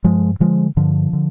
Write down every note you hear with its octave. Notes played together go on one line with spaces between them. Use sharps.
G2 F3 G#3
D3 F3 G#3
G2 D3 F3
D3